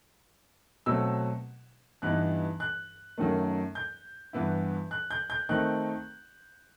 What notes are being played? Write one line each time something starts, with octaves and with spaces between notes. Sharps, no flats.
B2 F#3 A3 C4 E6
G2 E3 G3 B3 D#4 F#6
F#6
F#2 D#3 F#3 A3
G6
G2 E3 B3 E4
F#6
G6
G6
D#3 A3 C4 D#4 F#6